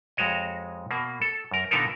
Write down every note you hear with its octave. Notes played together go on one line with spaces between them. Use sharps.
F2 G#3 F#4 C#5 D#5
B2 A#3
A4
F#2 A#4
A#2 D3 B3 D#4 A4 A#4